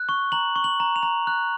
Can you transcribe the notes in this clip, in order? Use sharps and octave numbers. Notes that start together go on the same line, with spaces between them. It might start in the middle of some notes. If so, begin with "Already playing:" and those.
Already playing: F#6
C#6
A#5 F#7
C#6
F#7
A#5
F7
A#5
F#6